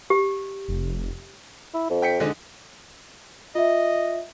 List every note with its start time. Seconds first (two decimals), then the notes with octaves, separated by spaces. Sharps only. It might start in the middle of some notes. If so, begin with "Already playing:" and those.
0.10 G4
0.68 F1
1.74 E4
1.90 F2
2.02 G5 B6 C#7
2.20 D3 G#3 D#4
3.55 F4 D#5 E5